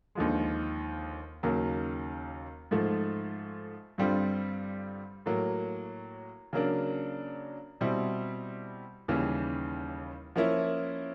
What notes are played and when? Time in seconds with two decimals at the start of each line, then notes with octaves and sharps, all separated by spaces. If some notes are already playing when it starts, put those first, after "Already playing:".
0.15 D#2 D3 F3 G#3
1.43 D#2 C#3 F#3 A#3
2.71 G#2 F3 A3
3.98 G2 D3 G3 C4 F4
5.26 A2 F#3 A#3
6.53 C#3 F#3 A#3 D4
7.81 B2 G3 C4 E4
9.08 D#2 C#3 E3 G3
10.36 F3 A#3 C#4 E4